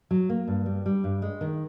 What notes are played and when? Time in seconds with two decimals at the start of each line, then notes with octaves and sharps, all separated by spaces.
0.11 F#3
0.29 A#3
0.48 G2
0.66 G3
0.86 G3
1.04 G2
1.22 G#3
1.41 D#3